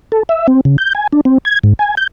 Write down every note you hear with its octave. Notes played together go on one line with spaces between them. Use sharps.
A4
E5
C4
C#3
G6
G#5
D4
C4
G#6
G#2
G#5
G6